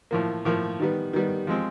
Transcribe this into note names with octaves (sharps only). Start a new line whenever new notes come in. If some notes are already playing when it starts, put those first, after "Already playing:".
A2 F3 A#3
A2 F3 A#3
D#3 G3 B3
D#3 G3 B3
F3 G#3 C4